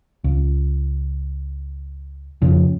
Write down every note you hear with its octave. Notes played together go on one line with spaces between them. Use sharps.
C#2
F2 C#3